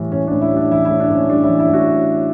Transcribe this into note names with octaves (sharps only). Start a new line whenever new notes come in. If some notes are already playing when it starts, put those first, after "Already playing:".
Already playing: A2 E3 G3
A2 C#4
D4
A2
E4
G3
D4
E3 E4
E4
A2
D4
A2 C#4
G3 D4
E4
E3
E4
A2 F#4